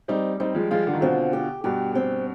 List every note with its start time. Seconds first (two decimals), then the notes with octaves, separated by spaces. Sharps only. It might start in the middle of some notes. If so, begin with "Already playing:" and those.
0.08 G3 C4 D#4
0.40 G3 C4 D#4
0.55 F3 G#3
0.71 F3 G#3 F4
0.87 D3
0.93 D#3
1.01 B2 D3 C4
1.33 G4
1.64 G2 B2 G4
1.95 C4